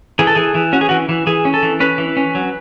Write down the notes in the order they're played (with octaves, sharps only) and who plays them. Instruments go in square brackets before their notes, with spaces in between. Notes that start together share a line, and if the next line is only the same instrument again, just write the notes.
[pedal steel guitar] E3 G#4
A4
E3 G#4
E3
C#4 F#4
G#4
E3 F#4
E3
E3 G#4
C#4
A4
E3
C#4 B4
E3
C#4
F#3